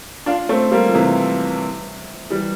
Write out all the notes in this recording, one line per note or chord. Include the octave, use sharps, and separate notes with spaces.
D4 F4
A3 C4
G3 A#3
F3
C3 E3
E3 G3